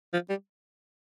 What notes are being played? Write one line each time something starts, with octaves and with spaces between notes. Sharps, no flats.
F3
G3